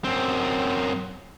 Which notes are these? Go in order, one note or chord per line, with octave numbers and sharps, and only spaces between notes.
F#2 C4